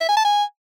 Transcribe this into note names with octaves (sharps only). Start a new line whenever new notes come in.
E5
G#5
A5
G#5